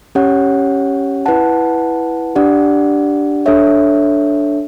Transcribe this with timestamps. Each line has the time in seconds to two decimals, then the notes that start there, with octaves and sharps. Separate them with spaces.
0.15 C#4 G4 C#5 F#5
1.26 E4 B4 F#5 A5
2.35 D4 G4 D5 F#5
3.46 D4 A4 C#5 E5